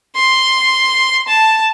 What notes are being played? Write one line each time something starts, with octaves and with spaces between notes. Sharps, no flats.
C6
A5